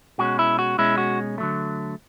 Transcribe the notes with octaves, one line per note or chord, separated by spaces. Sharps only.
B2 G#3 C#4 F#4
E4
F#4
B2 G#3 C#4 E4
F#4
D3 F#3 A3